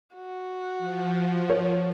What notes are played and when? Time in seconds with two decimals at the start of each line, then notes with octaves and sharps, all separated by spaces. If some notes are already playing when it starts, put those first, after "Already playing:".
0.15 F#4
0.78 F3
1.50 C#5